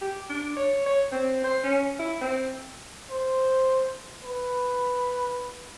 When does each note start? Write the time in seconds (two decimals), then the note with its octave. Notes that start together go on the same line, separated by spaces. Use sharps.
0.01 G4
0.30 D4
0.56 C#5
0.86 C#5
1.12 C4
1.44 C5
1.64 C#4
1.99 E4
2.21 C4
3.11 C5
4.25 B4